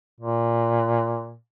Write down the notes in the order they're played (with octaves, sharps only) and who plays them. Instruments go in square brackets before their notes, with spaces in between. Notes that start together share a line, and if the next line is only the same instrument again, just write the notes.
[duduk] A#2